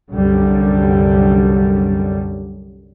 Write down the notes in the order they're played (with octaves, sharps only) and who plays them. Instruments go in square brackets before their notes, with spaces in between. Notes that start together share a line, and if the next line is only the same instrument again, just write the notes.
[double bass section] C2 F#2 D3 G3